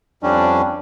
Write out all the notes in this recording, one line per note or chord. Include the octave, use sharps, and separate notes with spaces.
F2 G3 C#4 D4